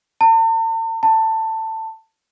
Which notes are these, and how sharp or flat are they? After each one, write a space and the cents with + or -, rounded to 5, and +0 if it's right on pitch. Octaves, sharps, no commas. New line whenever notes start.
A5 +45
A5 +20